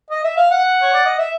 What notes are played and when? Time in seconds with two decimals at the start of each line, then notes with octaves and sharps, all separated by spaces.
0.10 D#5
0.24 E5
0.37 F5
0.50 F#5
0.81 C#5
0.93 D5
1.05 D#5
1.18 E5